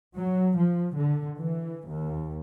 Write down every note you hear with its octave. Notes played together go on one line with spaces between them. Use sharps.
F#3
F3
D3
E3
D#2